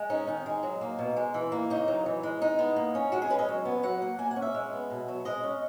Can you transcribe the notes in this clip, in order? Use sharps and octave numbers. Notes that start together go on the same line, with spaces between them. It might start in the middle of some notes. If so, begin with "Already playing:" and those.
Already playing: G#3
C#4 D#4
D#3 D#4
G#3
F#3
A#3
B2
G#3
E3
A#3
C#3 D#4
F#3
E3
G#3
G#3 D#4
B3
A#3
C#4
G#3 F#4
G#4
C#4 B4
D#5
F#3
B3
F#3 F#5
A#3
A#3 G#5
F#5
C#4
E5
G#3
B3
B2
F#3
G#3 D#5
C#4